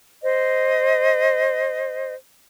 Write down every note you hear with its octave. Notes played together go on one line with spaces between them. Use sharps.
C5 D#5